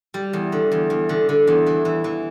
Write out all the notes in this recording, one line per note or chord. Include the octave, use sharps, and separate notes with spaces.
G3
E2
D3
E2
E2
D3
D3
E2
E3
E3
E3